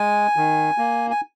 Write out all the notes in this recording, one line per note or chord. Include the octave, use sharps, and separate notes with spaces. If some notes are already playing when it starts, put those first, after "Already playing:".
Already playing: G#3 G#5
D#3
A#3
G#5